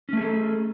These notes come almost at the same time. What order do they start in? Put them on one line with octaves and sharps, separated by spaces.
C#4 A3 G#4 A4